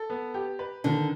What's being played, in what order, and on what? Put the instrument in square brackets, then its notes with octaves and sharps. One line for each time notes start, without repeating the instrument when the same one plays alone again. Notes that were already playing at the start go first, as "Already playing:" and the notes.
Already playing: [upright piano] A4
B3
G4
B4
[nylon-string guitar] D3 [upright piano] D#3